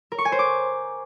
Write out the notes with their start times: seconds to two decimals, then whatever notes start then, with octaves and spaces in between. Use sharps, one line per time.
0.12 A#4
0.18 C#6
0.25 G#5
0.32 C5
0.39 D6